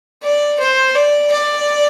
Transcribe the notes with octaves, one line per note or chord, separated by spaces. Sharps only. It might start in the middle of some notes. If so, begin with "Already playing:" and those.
D5
C5
D5
D5